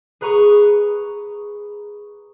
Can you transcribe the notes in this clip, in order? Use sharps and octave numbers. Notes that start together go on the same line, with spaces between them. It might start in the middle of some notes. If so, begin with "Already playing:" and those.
G#4 B4 A#5 C#6 D#6